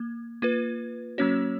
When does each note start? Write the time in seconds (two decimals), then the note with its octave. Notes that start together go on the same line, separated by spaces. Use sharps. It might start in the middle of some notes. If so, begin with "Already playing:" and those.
Already playing: A#3
0.42 A#3 F4 B4
1.18 F#3 A#3 C#4 F#4 C#5